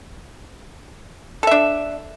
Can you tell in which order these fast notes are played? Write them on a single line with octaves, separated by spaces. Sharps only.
A4 E5 D4